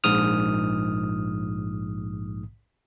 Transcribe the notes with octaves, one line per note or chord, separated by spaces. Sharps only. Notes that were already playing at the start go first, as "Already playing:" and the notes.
A#1 G#2 D#6 F6